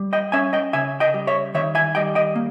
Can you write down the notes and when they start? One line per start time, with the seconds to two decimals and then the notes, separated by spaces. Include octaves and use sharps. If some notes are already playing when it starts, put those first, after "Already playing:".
Already playing: G3
0.13 D#5 G5
0.32 C#4 E5 G#5
0.53 D#5 G5
0.73 C#3 E5 G#5
1.00 D#5 G5
1.14 G3
1.27 C#5 E5
1.54 D#3 C#5 E5
1.75 E5 G#5
1.95 G3 D#5 G5
2.15 D#5 G5
2.36 A#3